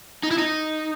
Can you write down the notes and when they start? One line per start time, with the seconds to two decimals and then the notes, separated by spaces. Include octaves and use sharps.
0.23 D#4
0.31 E4
0.38 D#4